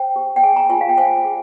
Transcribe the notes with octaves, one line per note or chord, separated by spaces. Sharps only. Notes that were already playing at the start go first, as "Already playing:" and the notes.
Already playing: C5 G5
G4
G5
G#4 G#5
A#5
F4 G#5
F5
G5
C5 G#5
G#4